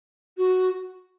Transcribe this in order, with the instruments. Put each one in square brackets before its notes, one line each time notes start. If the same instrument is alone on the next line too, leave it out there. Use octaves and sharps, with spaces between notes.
[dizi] F#4